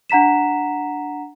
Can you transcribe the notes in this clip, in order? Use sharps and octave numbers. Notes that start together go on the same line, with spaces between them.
D4 F#5 A#5 B6 E7